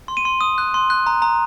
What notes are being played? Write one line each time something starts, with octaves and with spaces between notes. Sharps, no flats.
C6
D#7
C6
D#6
F#6
C6
F#6
A#5
A#5